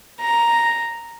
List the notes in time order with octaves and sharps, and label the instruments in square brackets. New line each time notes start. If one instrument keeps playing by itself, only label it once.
[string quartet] A#5